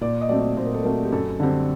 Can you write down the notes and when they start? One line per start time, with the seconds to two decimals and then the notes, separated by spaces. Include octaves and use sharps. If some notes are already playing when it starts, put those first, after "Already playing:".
0.01 A#2 D5
0.21 D#5
0.29 F#3 A3 C4 D5
0.57 A#2 C5
0.65 A#4
0.74 A4
0.83 F#3 A3 C4 A#4
1.03 G4
1.12 F#2 A4
1.40 D3 G3 C4